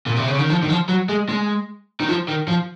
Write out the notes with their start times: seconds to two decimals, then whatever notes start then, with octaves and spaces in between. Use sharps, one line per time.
0.07 A#2
0.17 C3
0.28 C#3
0.39 D#3
0.50 F3
0.63 D#3
0.70 F3
0.89 F#3
1.09 G#3
1.29 G#3
2.00 D#3
2.09 F3
2.29 D#3
2.49 F3